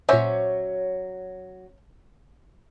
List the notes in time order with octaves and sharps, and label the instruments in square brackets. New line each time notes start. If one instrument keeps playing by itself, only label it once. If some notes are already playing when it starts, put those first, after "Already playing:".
[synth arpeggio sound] A#2 C#5 D6 [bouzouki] F#3 [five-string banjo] C#4 C5 E5